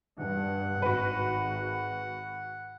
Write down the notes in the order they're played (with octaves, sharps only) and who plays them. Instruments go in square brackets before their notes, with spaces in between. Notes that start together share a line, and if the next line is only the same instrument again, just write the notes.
[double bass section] G2 [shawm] F#5
[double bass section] G#1 [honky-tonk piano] F#4 B4